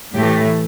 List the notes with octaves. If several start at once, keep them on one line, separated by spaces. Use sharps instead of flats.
A2 E3 A3 G4